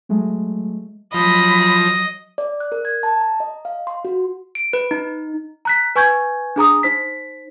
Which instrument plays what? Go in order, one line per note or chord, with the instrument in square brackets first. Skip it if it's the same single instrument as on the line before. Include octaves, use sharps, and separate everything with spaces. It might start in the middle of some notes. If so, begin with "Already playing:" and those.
[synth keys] F#3 G#3 A3
[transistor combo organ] F3 [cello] F#3 [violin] D#5 [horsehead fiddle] B5
[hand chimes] D5
F#6
A#4
G#6
A5
A#5
D#5
F5
C6
F#4
[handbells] D7
B4
D#4
[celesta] A#5 F#6 B6
B4 G#5 C#6 G6 G#6
D4 G#4 A#5 D#6
D#4 C5 B6